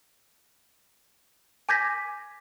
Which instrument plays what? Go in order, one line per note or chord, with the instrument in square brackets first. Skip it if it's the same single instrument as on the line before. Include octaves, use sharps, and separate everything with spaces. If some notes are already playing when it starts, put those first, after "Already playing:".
[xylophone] G#5 D6 G6 G#6 A#6 B6